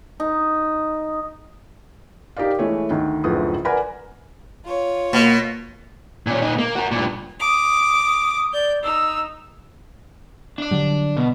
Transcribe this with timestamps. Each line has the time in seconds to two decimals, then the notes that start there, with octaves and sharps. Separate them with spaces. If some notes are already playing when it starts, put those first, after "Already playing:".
0.20 D#4
2.37 D#4 G4 A#4 D5 F5
2.59 E3 G#3 A3 C#5
2.90 D2 D#3
3.24 F#1 D2 A2 F3 B4 D#6
3.65 A#4 B4 D5 F#5 G#5 B5
4.65 F4 C#5
5.13 B2 A#3
6.27 A#2 C#4
6.42 A#2 D#4
6.59 A#3
6.75 F#4 A#4
6.91 G2 A#2
7.41 D6 D#6
8.53 D5 G6
8.83 D#4 E6
10.58 D4 D5
10.71 D3 F#3 G3
11.17 B2